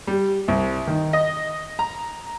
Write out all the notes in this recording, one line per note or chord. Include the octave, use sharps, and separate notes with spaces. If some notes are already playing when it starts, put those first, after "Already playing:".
G3
C2
D#3
D#5
A#5